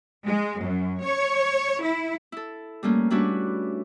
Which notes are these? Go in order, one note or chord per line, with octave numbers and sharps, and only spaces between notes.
G#3
F#2
C#5
E4
E4 A4
G3 A3 A#3 C#4
G3 C#4 D4 E4 F#4 B4